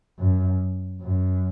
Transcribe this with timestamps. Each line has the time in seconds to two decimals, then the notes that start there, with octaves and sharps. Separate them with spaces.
0.19 F#2
1.02 F#2